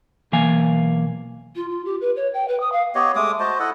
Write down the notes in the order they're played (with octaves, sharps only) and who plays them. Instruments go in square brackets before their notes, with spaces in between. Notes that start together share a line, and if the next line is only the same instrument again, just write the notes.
[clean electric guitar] B1 E3 A#3 F5 G#5
[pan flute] F4
F4
G4
B4
C#5
G5
B4
D#6
F5
[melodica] B3 G4 C#5 D#5
G#3 A3 D6 D#6
F#4 C5 D#5 A5
E4 A4 D#5 F#5